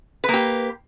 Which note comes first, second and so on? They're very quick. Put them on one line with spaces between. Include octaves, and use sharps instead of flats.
B4 A#3 G4